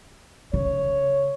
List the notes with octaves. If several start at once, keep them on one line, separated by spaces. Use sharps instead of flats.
C#3 C#5